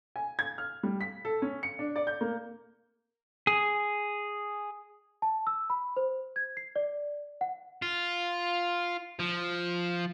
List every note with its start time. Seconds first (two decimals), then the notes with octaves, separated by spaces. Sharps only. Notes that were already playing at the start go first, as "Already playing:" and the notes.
0.16 G#5
0.39 G#6
0.58 F6
0.83 G3
1.01 B6
1.25 A4
1.42 C#4
1.63 C#7
1.79 D4
1.96 D5
2.07 G6
2.21 A#3
3.47 G#4
5.22 A5
5.47 E6
5.70 B5
5.97 C5
6.36 G#6
6.57 C7
6.76 D5
7.41 F#5
7.82 F4
9.20 F3